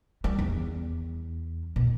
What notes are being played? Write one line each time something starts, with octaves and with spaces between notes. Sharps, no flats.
G3
E2
B2